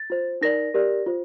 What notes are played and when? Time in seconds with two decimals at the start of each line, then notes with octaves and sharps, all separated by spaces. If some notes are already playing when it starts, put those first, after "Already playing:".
Already playing: A6
0.10 F4 C5
0.41 D#4 A#4 D5 A#6
0.74 G4 A#4 D5
1.06 F4 C5